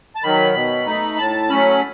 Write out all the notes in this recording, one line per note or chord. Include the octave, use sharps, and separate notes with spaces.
A5
D#3 F#3 B5
B2
A3 D#4
A2 A5
F#3 A3 C#4 B5